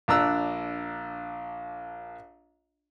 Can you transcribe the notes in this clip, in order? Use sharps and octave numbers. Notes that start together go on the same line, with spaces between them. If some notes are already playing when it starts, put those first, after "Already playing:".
A#1 D4 A#5 E6 F#6